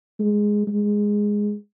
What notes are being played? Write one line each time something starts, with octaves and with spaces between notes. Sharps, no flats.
G#3
G#3